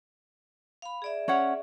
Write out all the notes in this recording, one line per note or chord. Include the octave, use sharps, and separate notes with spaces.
F5 B5
G#4 D5 E5
C#4 C#5 F#5